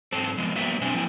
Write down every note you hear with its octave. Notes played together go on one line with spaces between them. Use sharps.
G#2 C4 A4 C5 A5
F3 G#3 B3 D#5
F#3 G3 A#3 B3 E5
F#2 B2 C4 D4 C5 G#5
F3 A#3 E4 F#5 G#5